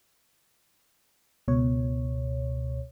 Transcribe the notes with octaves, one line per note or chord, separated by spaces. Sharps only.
C#2 B2 C#5